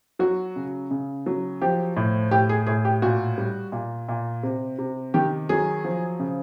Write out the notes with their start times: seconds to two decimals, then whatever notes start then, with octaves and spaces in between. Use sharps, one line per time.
0.19 F#3 F#4
0.56 C#3
0.91 C#3
1.26 F#3
1.61 F3 G4
1.96 A2
2.31 A2 G4
2.49 G#4
2.67 A2 G#4
2.85 G4
3.02 A#2 F#4
3.38 G3
3.72 A#2
4.08 A#2
4.43 C3
4.79 C3
5.14 D#3 G4
5.49 F#3 G#4
5.85 F3
6.19 C#3